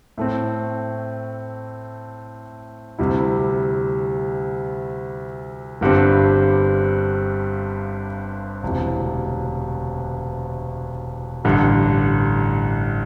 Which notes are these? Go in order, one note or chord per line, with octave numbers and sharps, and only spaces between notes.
A2 A3 C4
D2 C3 G3 E4
G1 G2 D3 G3 C4
E1 D2 C3 E3
A1 G2 D3